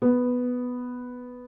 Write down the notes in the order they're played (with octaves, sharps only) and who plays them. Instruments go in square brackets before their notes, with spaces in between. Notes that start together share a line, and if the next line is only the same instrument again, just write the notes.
[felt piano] B3